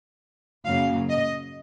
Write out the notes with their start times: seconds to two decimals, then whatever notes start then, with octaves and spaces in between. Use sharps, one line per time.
0.65 F#2 C#3 F#3 A#3 F5
1.09 D#5